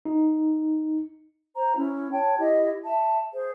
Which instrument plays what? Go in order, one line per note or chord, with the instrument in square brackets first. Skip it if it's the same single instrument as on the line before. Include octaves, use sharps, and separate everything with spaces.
[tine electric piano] D#4
[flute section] C5 A#5
C#4 E4
C#5 G5 A5
E4 G4 D#5
E5 A5
G#4 C5